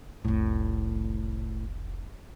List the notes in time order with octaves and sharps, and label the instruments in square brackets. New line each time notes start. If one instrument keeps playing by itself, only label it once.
[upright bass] F1 C2 [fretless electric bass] A2